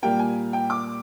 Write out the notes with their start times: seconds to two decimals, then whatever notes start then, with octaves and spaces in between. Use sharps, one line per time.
0.02 A#2 G3 A#3 G5
0.19 G#5
0.53 G5
0.70 D6